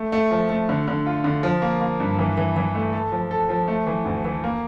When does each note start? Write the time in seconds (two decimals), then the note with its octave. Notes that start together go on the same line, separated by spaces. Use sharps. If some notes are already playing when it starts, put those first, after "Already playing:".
Already playing: A3
0.12 A3
0.31 F3
0.49 A3
0.69 D3
0.88 D3
1.06 F4
1.24 D3
1.43 F3
1.62 A#3
1.81 A#3
2.00 G2
2.19 E3
2.37 E3
2.56 E3
2.75 A3
2.93 A4
3.12 F3
3.31 A4
3.49 F3
3.68 A3
3.86 E3
4.05 D2
4.25 E3
4.44 A#3